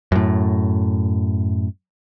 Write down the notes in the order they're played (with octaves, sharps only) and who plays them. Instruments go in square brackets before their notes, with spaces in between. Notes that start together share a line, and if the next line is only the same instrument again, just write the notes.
[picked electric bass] F#2 A2